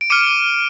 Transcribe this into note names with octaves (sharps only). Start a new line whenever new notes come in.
D7
D6 F6 C#7 D#7
D#7